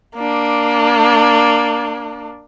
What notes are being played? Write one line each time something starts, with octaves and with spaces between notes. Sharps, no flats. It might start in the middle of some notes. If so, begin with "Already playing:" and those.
A#3 D4